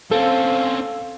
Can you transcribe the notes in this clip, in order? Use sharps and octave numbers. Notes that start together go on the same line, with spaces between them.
C4 C#4 A4 F5